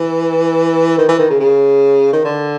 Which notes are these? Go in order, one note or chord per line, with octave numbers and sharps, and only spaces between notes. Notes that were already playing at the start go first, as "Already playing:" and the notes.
Already playing: E3
D#3
E3
D#3
C#3
C#3
D#3
D3